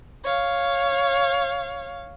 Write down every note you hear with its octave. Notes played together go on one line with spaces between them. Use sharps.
C#5 F5